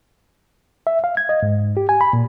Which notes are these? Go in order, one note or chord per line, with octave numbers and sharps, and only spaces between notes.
E5
F5
G#6
D#5
G#2
G4
G#5
B5
A#2